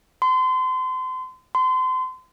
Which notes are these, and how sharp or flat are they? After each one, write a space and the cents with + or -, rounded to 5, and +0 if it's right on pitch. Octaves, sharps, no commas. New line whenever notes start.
C6 -30
C6 -30